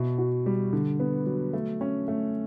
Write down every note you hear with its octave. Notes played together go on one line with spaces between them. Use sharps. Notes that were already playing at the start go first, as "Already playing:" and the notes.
Already playing: B2 E4
F#4
G3
D3
B3
F#3
A3
C#4
A3